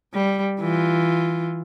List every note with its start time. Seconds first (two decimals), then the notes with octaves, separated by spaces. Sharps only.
0.14 G3
0.60 E3 F4